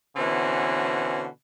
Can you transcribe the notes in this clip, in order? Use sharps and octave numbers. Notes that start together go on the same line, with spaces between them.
B2 D3 E3 C4 C#4